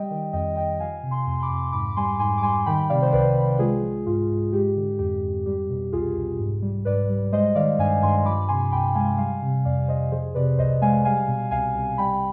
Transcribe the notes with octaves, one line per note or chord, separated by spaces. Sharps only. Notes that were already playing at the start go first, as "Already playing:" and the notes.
Already playing: G3 D#5 G5
D#3
F2 D#5 G5
F2 D#5 G5
F3 F5 G#5
C3
G#5 C6
F2 C6
B5 D6
F2
G#2 B5 D6
G3 G#5 C6
G#2 G#5 C6
D6
G3 G#5 C6
D#3 G5 B5
C3 D5 F5
C5
C2 B4 D5
C2
G#3 F4 G#4
F3
G#2 F4
G#2
G#3 G4
D3
F2 G4
F2
G3 G4
B2
C2 F4 G#4
C2
G#2
G3
G#2 B4 D5
G3
G#3 C5 D#5
D#3 D5 F5
G2 F5 G#5
G2 G#5 C6
F3 B5 D6
C3 G#5 C6
C2 G5 B5
G#3 F5 G#5
G3 F5 G#5
C3
F2 D5 F5
F2 C5 D#5
F3 G#4 C5
C3 B4 D5
C2 C5 D#5
G#3 F5 G#5
G3 F5 G#5
B2
C2 F5 G#5
C2
G3 G5 B5